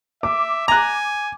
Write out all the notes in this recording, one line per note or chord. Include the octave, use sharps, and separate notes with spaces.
E5 D6
G#5 A#5 F#6